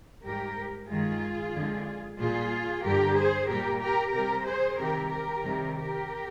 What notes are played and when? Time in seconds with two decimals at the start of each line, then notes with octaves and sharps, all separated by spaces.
0.24 G#2 G3 G4 A#4
0.88 G2 D#3 G#3 F4 G#4
1.54 F2 D3 G#3
2.19 A#2 G3 F4 G#4
2.83 G2 D3 G3 G4 A#4
3.16 G#4 C5
3.49 A#2 G3 G4 A#4
3.80 G4 A#4
4.13 C3 G3 G4 A#4
4.45 G#4 C5
4.78 C3 D#3 G3 G4 A#4
5.10 G4 A#4
5.43 F2 C3 D#3 G3
5.75 G4 A#4